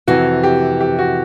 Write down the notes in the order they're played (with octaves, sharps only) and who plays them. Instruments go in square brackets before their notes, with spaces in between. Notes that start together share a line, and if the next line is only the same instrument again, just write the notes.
[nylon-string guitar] F2 C3 E3 [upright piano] F#4
[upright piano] G4
G4
F#4